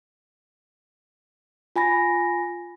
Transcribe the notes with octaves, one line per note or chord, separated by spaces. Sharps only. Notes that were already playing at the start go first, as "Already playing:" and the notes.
F4 G#5 B5 A#6